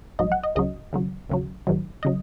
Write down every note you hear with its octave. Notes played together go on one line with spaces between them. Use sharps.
A#1 G#2 F#3 D#5
F#5
D#5
C#2 C#3 F#3 D#5
D#2 C#3 F#3
D#2 C#3 F#3
A#1 G#2 D#3 F#3
C#3 F#3 D#5